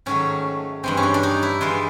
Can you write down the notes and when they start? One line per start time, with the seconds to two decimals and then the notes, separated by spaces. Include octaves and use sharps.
0.06 G#2 D#3 F#3 A3 C#4
0.83 G2 E3 G#3 C4
0.97 C#4
1.03 D4
1.14 D4
1.23 D#4
1.43 E4
1.61 G2 E3 G#3 F4